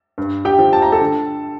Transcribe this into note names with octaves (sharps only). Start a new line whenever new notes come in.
G2
G4 G5
F3
A5
A#5
A4 A5
D3